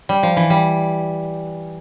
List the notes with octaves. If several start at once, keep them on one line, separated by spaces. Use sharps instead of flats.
G3
F3
E3
G3